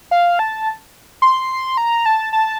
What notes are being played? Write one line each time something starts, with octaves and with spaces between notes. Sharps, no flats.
F5
A5
C6
A#5
A5
A5